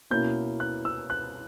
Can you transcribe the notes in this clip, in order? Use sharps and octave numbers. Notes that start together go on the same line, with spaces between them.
B2 A#3 C#4 E4 G6
F#6
E6
F#6